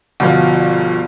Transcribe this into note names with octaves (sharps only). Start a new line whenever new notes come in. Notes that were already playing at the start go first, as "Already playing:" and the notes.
G1 B2 F3